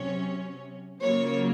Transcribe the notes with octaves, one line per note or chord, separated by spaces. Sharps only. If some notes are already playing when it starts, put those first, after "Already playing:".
Already playing: C3 F#3 C#4 C#5
C#3 F#3 A#3 F4 C#5